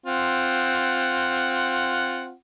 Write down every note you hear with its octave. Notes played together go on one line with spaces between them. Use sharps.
C4 F4 F#5